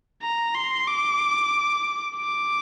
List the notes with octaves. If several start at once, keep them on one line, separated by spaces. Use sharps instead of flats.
A#5
C6
D6
D6